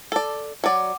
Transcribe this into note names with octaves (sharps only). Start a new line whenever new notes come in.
A4 D5
F#3 D5 F#5 D6